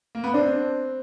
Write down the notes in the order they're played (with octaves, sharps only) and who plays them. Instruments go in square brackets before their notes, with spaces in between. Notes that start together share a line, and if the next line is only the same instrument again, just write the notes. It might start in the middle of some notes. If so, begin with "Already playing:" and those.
[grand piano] A#3
B3
[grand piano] C4 [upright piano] D4